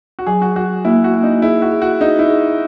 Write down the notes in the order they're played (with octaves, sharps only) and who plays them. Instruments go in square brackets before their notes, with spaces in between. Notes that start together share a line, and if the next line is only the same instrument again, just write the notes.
[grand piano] F#4
[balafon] F#3 [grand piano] G#4
[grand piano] F#4
[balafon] F#3 [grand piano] F#4
[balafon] A#3 [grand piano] E4
[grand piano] F#4
[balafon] A#3
[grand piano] D#4
[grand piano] E4 [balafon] G#4
[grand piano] F#4
[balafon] G#4
[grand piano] F#4
[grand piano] D#4 [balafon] G#4
[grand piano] E4
[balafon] G#4